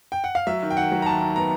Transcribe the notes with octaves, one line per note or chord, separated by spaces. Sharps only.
G5
F#5
F5
F#3 E5
D#3
G5
D#3 F#5
F#3
A#5
D#2 A5
D#3
B3 A#5